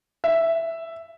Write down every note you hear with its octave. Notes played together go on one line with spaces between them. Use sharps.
E5